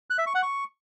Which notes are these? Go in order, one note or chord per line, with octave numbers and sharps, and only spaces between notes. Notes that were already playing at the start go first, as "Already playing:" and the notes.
F#6
E5
C#6
F#5
C#6